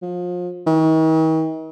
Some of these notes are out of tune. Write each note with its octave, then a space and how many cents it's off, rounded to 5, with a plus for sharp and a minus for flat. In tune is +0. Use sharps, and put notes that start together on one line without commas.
F3 +30
D#3 +45